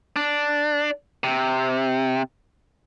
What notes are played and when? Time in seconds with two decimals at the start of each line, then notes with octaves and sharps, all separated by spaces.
0.16 D4
1.24 C3